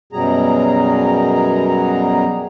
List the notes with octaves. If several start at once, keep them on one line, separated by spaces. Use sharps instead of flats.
F#2 B2 F#3 G3 G#4 A#5